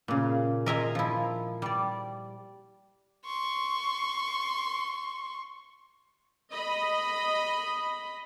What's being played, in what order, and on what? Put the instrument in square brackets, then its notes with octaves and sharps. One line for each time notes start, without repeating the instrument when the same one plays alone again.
[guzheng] A#2 C#3
A#4 D#5 E5 G#5 A#5 C6
F3 E4
G3 D5
[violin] C6 C#6
[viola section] D#5 B5